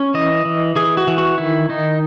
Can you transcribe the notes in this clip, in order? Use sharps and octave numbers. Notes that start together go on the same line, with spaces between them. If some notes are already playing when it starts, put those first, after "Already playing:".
Already playing: C#4
E3 D#5
E3
E3 G#4
F#4
E3
F#4
D#3 E4
D#3 D#4